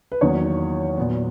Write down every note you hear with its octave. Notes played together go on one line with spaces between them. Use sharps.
B4
E2 D#3 F#3 A#3 C#5
A#2 F#3 B3